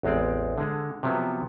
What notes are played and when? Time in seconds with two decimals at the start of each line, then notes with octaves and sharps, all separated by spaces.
0.03 A1 E2 G#3 C4 D5
0.58 D3 G#3
1.03 C3 F3 F#3 B3